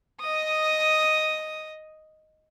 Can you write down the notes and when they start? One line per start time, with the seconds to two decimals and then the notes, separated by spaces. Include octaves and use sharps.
0.20 D#5 D#6